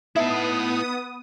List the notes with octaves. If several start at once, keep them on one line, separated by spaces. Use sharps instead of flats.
B3 D#4 E4 E5 A5 D#6